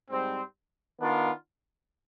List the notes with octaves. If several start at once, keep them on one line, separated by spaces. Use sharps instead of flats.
G#2 G3 C4
D#3 B3 D4 F4